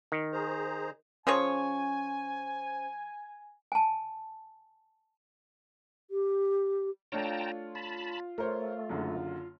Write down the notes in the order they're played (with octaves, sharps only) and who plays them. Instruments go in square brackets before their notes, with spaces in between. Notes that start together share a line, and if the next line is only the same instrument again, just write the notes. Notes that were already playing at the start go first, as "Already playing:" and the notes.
[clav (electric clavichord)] D#3
[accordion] G#4 C5 A#5
[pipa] F3 G#4 C#5 [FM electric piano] C#4 C5 [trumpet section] G#5
[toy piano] G#5 A5
[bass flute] G4
[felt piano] A3 D4 C#5 [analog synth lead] F4 [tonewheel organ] G5 A5 A#5
[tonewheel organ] A5 B5
[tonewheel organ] A3 [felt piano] A#4 C5 C#5
[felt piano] F#1 F#2 D3